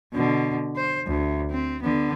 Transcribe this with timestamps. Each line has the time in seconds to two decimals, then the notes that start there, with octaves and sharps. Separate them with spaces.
0.13 B2 D3
0.76 C5
1.07 D2
1.51 C4
1.82 D3 B3